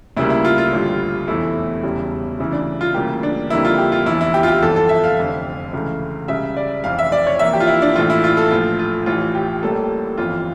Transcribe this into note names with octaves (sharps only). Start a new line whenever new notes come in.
D2 C#3 G3 A#3 E4
E4
F4
F4
A1 G2 D3 G3
F1 E2 E3 A3 E4
E1 E2 C#3 G3
D2 C#3 E3 E4
D4
F4
D2 C#3 E3 G3 A#3 G4
D4
F2 D3 G3 A#3 E4
F4
G4
F4
F1 E2 E3 E4
E4
G4
F4
G4
G1 F2 E3 A4
A4
E5
F5
F1 F2 D3
C#2 C#3 E3 A3
C#2 C#3 G3 E5
D5
F1 F2 E3 F5
E5
D5
C#5
F2 E3 A#3 E5
G4
F4
E4
D4
A#1 A2 E3 A3 F4
E4
F4
A4
A#1 A2 F3 F4
F4
A1 A2 E3 F4
G4
A1 A2 G3 A#3 A4
G1 F2 E3 F4